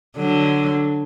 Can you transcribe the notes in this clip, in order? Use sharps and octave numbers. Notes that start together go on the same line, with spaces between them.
D3 F#3